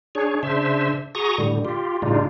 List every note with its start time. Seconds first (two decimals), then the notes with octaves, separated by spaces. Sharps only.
0.15 D4 G#4 C#5
0.43 C#3 D4 C5 E5
1.15 F#4 G#4 A#5 C#6 D#6
1.38 A2 D3 G3
1.65 F4 G4
2.02 A2 C#3 G3 D4 D#4 F4